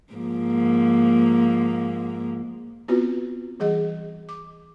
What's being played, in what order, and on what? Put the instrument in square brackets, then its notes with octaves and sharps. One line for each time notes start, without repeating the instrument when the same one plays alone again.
[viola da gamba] G#2 F3 A#3
[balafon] B3 C4 F4 F#4 B4
E3 G3 G#4 D#5
D6